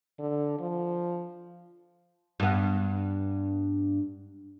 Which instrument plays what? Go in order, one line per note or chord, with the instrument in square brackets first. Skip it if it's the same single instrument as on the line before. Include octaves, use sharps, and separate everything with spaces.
[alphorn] D3
F3
[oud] G2 B3